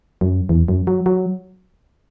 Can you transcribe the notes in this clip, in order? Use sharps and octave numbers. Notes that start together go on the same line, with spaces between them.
F#2
E2
F#2
F#3
F#3